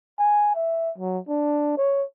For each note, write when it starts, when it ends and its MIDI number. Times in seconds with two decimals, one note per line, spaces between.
0.19 0.52 80
0.55 0.91 76
0.98 1.19 54
1.28 1.74 62
1.77 2.04 73